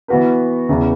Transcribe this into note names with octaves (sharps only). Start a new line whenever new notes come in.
E3 B3 F#4 B4
E2 C#3 E3